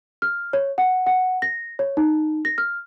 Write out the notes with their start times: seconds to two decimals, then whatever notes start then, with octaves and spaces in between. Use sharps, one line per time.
0.22 F6
0.53 C#5
0.78 F#5
1.06 F#5
1.42 A#6
1.79 C#5
1.97 D#4
2.45 A#6
2.58 F6